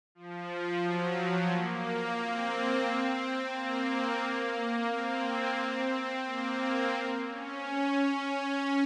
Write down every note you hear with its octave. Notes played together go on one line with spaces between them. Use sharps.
F3
F#3
A#3
C4
A#3
A#3
C4
C4
A#3
C4
C#4
C#4